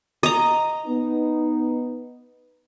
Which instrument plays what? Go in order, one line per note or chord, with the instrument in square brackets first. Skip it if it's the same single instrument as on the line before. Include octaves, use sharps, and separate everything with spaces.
[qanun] D#5 A#5
[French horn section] B3 D#4